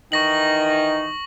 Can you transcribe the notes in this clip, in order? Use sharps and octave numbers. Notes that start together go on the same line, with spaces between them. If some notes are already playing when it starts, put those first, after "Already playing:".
D#3 E3 D#4 C#6 A#6 F#7